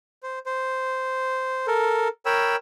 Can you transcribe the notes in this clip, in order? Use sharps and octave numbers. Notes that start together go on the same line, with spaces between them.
C5
C5
A4 A#4
A#4 C#5 G5 B5 E6